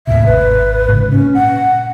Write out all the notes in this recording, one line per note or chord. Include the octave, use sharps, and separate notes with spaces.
D#2 A2 C3 E5
G#1 B4
G#2 C#3
A#2 C#4
F#5